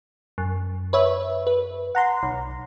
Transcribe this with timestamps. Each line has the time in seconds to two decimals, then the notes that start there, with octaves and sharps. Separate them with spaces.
0.38 F#2
0.93 B4 C#5 E5
1.47 B4
1.95 F#5 A#5 C6
2.23 B1